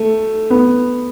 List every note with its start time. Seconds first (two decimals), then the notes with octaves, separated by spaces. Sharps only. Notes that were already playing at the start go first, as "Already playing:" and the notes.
Already playing: A3
0.50 B3